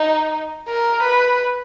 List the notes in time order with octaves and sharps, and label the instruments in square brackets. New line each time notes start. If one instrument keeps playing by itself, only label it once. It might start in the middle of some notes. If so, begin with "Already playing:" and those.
Already playing: [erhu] D#4
A#4
B4